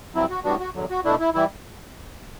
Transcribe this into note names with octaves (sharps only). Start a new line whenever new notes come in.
G2 F#3 C4 E4
F#4
A2 G3 B3 D4 F#4
F#4
E2 D3 F#3
F#4
B2 A3 D4 E4
E4
E3 G3 E4